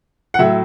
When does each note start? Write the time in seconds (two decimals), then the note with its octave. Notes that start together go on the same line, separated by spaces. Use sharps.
0.34 F#5
0.39 A2 F#3 E5